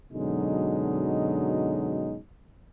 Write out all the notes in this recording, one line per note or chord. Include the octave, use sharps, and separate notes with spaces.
F#2 B2 D3 F#3 G#3 D#4